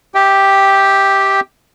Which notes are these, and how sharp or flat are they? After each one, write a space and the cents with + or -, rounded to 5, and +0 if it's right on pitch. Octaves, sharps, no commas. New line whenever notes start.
G4 +0 E5 -35 G5 +0